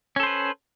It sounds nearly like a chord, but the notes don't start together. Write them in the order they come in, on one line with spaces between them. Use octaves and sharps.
C#4 A4 C5 B4